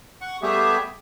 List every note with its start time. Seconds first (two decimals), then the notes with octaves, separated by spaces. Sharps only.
0.21 F#5 C#6
0.42 G3 A3 B3 G4 G#4 E5